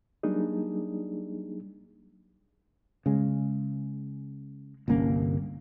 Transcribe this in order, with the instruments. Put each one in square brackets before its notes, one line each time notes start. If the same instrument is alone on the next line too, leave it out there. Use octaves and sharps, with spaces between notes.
[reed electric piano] F#3 G3 A#3 D4 D#4 G#4
[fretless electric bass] C#3 G#3
G1 C2 A#3 C#4